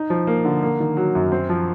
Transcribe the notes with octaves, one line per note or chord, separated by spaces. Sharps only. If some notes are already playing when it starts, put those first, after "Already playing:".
Already playing: D#4
F3
A#3
D3
A#3
D#3
F#3
F#2
C4
F3